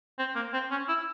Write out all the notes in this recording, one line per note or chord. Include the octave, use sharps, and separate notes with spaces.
C4
A#3
C4
C#4
E4